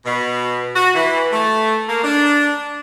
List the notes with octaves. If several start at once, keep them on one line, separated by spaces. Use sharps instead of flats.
B2
F#4
E3
A3
A#3
D4